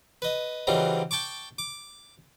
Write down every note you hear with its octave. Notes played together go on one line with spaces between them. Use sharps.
B4 D#5
C#3 E3 F#3 G3 C4 D#4
G5 A5 C#6 D6
D6